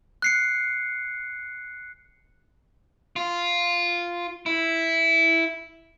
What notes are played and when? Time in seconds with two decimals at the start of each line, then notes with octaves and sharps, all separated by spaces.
0.22 F#6 C7 C#7
3.16 F4
4.46 E4